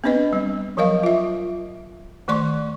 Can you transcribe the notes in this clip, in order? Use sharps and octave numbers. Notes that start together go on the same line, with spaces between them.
B3 C4 D4 B4 D#5
G3
F3 F#3 A#4 D#5 F5
F4 E5
D#3 A3 D5 C6 C#6